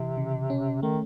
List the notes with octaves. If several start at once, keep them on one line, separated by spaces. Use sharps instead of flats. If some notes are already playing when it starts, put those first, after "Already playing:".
Already playing: C3 E3
C#3
C#4
D#3 A3